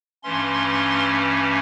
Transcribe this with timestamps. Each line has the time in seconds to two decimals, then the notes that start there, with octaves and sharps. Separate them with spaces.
0.23 G2 E3 A3 C#4 C6
0.67 C6